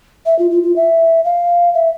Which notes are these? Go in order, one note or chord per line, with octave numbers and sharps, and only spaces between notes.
E5
F4
F4
F4
E5
F5
E5